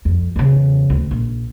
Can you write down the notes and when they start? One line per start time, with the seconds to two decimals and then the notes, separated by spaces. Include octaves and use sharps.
0.05 F2
0.36 E2 C#3
0.90 D2
1.11 A#1